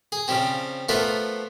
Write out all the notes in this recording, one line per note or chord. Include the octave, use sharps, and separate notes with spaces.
G#4
C#3 F3 G3 C4
F3 A3 B3 F4 A#4 D5